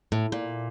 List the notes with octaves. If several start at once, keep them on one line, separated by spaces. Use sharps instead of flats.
A2
A#2